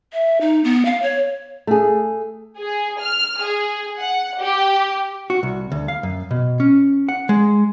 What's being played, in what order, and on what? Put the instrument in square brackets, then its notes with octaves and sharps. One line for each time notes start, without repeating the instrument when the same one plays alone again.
[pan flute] E5
D#4
B3
F5
C#5
[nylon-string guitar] A3 G#4
[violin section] G#4
F6
G#4
F#5
G4
[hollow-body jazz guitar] F#4
C2
D2
F5
F#2
B2
C#4
F#5
G#3